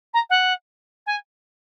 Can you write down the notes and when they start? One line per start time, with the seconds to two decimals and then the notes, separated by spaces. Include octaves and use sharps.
0.13 A#5
0.29 F#5
1.06 G#5